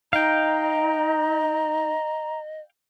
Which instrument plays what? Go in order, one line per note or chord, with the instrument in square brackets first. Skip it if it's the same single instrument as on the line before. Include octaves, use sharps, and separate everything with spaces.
[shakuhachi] D#4 [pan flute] D#5 [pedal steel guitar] F5 G5 [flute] A#5